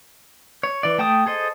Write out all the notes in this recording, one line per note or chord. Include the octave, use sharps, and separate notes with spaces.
C#5
E3 D5
A3 G5 A5 D#6
G#4 A4 C5 D#5